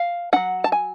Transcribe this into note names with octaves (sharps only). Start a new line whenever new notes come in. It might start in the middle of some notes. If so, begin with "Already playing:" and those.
Already playing: F5
F#3 C#4 F#5
A5
G#5